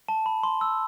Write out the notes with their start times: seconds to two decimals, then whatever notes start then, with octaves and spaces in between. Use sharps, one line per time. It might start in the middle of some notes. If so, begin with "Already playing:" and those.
0.09 A5
0.26 B5
0.43 C6
0.61 E6